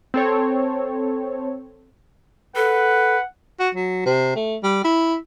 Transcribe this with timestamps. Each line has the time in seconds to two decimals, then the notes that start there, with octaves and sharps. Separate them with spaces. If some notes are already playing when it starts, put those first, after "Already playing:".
0.14 C4 A4 C#5
2.56 A4 B4 F#5
3.60 F#4
3.75 F#3
4.06 C3
4.36 A3
4.63 G3
4.84 E4